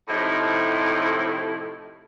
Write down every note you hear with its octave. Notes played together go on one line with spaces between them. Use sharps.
A2 C3 F3 A3 D#4 E4